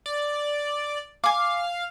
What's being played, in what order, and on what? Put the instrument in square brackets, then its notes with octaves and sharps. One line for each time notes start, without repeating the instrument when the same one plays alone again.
[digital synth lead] D5
[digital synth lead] F5 [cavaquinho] G#5 D6